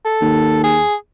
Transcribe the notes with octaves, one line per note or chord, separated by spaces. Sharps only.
A4
D#2
G#4